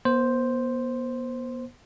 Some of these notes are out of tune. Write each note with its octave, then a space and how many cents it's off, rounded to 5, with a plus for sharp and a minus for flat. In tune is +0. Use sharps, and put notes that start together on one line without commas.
B3 -40 C5 +0